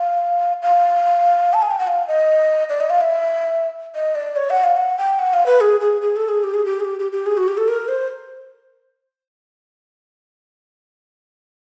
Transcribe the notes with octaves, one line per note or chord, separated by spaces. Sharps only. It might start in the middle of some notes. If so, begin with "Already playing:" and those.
Already playing: F5
F5
A5
G#5
G5
F#5
F5
D#5
D5
D#5
F5
E5
D#5
D5
C#5
F#5
F5
F#5
G5
F#5
F5
B4
G#4
G#4
G#4
A4
G#4
G4
G#4
G4
G#4
G4
G4
G4
G#4
F#4
G4
A4
A#4
C5